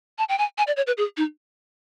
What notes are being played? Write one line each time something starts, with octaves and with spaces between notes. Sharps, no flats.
A5
G5
G#5
G#5
D5
C#5
B4
G#4
D#4